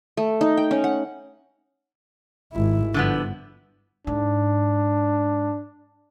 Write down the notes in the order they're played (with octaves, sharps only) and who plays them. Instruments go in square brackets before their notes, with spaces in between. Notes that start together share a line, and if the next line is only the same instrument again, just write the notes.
[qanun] A3
D#4
G5
C#4
F#5
[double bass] G#1 E4
[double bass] G1 [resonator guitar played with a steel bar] D3 F3 B3
[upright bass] G#2 [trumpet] D4